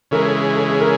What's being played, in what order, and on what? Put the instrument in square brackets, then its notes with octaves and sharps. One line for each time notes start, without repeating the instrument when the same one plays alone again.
[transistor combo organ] C#3 E3 G#3 [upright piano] A#4
[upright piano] A4
G#4
A4
G#4
A#4